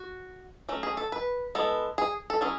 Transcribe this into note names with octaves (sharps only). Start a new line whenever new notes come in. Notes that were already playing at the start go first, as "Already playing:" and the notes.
Already playing: F#4
F#3 A3 C#4
G#4
A4
B4
G#3 B3 E4 A4
G#4
A4
F#3 C#4 E4 G#4